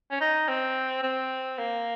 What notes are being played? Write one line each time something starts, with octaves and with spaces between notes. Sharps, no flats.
C#4
D#4
C4
C4
A#3